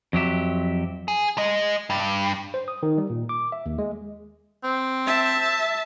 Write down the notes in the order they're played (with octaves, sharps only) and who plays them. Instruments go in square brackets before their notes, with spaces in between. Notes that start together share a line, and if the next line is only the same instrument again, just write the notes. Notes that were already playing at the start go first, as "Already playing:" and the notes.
[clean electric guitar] F2 F#3 G4 E5
[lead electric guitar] G#4
G#3 D#5
G2
[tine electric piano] C5
D#6
D#3
G3
A#2
D6
E5
D#2
G#3
[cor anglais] C4
[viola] E5 A5